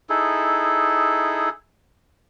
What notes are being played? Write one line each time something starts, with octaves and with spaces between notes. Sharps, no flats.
D#4 E4 G#4 A4